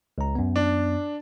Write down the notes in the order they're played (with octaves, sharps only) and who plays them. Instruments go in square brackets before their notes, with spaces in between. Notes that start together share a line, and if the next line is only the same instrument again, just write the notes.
[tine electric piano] C#2 A#5
F#2 B3
[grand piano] D4